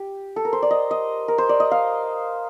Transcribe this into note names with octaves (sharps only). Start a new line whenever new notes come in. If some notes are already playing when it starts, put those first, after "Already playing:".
Already playing: G4
A4
A#4
C5
D5
D#5
D#5
A#4
C5
D5
D#5
F5